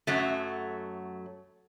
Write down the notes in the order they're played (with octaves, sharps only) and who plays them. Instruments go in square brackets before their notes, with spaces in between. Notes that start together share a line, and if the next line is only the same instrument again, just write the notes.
[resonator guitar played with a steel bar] F#2 F#3 A3